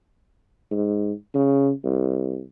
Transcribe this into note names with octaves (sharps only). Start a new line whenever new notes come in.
G#2
C#3
C2